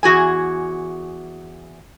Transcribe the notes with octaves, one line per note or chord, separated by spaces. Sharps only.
E2 F#4 G#4 G#5